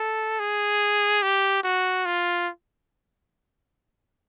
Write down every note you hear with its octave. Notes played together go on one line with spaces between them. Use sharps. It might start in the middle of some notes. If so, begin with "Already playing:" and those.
Already playing: A4
G#4
G4
F#4
F4